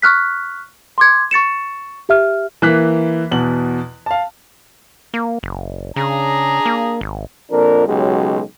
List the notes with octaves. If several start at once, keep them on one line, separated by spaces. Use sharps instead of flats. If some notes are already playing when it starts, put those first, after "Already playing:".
C#6 F6 F#6 B6
C6 D6 G#6
C#6 A6 C#7 E7
G4 E5 F6
E3 A#3 E5 F#6 B6
E2 B2 F#7
F5 A5
A#3
F#1
C#3 D4 G#4 A#5
A#3
G#1
F2 A#2 D4 A#4
B1 C#3 F#3 G#3 G4